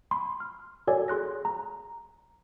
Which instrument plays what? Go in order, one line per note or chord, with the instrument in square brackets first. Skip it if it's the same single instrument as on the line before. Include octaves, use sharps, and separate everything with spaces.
[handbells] B5 C6
F6
F#4 A4 A#4 C#5 D5 G#5
G#4 C6 F#6 A#6
A#5